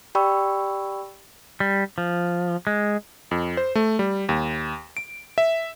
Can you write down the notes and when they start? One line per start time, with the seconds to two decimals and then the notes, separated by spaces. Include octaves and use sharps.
0.15 G4 D5 G5 B5 C#6 E6
1.60 G3
1.98 F3
2.67 G#3
3.31 F2
3.57 C5
3.75 A3
3.99 G3
4.29 D#2
4.97 D7
5.38 E5